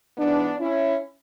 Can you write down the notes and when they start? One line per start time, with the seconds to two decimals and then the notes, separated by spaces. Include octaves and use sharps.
0.18 G#2 E3 B3 D4
0.60 C#4 E4